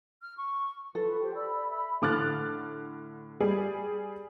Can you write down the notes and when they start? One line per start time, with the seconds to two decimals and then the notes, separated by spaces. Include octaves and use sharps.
0.22 F6
0.37 C#6
0.95 F4 A4 B4 C#6
1.21 G4 C5 G5
1.34 D5 B5 E6
1.69 E5 B5 E6
2.02 A2 D3 D6 F6 F#6 A6
3.40 G3 G#4 D5